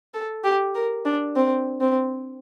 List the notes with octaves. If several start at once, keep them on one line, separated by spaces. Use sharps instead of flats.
A4
G4
A#4
D4
C4
C4